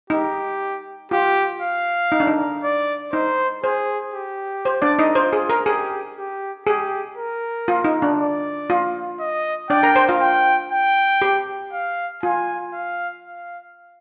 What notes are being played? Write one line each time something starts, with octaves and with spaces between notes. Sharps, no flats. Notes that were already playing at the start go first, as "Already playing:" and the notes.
D#4 G4
F4 G4
F5
D#4
D4
D#4
D5
D#4 C5
G#4 C5
G4
C5
D4 D5
D#4 D#5
F4 C5
G#4
A#4
G4 G#4
G4
G4 G#4
A#4
F4
D#4
D4
D5
F4
D#5
D4 D5 G5
A#4 A#5
C5 C6
F4 F5
G5
G5
G4
F5
F4 G#5
F5
F5